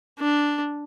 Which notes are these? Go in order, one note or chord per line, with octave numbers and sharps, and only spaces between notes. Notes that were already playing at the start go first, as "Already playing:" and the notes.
D4